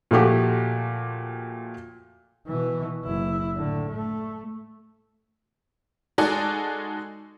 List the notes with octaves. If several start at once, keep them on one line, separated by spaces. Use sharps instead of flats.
A#2 F3 A3 F#4 G4
B2 E3
F#1 E4
A2 D3
A3
G#3 D#4 F#4 A4 D5 G#5